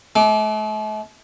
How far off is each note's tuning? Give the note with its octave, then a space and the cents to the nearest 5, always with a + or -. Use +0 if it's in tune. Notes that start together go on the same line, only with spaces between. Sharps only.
A3 -45 D6 +0